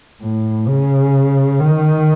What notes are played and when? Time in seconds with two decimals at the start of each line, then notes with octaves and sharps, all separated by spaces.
0.22 A2
0.67 C#3
1.59 D#3